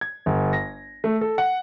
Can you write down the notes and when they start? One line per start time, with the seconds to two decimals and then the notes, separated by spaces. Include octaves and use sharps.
0.01 G#6
0.26 G1
0.53 A#6
1.04 A3
1.21 A4
1.38 F#5